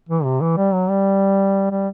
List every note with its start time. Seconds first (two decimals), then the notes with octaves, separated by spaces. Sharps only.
0.09 E3
0.25 C3
0.41 E3
0.57 G3
0.74 F#3
0.90 G3
1.71 G3